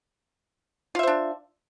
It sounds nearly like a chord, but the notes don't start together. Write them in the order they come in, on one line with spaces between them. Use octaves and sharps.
F4 E5 C5 D4